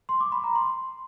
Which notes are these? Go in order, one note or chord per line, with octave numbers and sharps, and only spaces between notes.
C6
D6
B5
A#5
C6